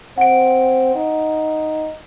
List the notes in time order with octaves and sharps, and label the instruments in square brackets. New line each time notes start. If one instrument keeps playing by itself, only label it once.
[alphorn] C4 [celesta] F#5 D7
[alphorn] D#4